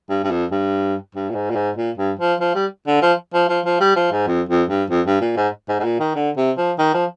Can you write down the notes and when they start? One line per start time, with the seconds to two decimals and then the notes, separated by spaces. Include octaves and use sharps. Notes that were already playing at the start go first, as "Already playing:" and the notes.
0.10 G2
0.24 G2
0.30 F2
0.51 G2
1.15 G2
1.30 A#2
1.35 G#2
1.50 A#2
1.56 G#2
1.76 A#2
1.98 G2
2.19 F3
2.40 F3
2.55 G3
2.87 D3
3.02 F3
3.34 F3
3.49 F3
3.65 F3
3.80 G3
3.96 F3
4.11 G#2
4.27 F2
4.49 F2
4.69 G2
4.90 F2
5.06 G2
5.21 A#2
5.37 G#2
5.69 G#2
5.79 G#2
5.84 A#2
6.00 D#3
6.16 D3
6.37 C3
6.57 F3
6.79 D#3
6.94 F3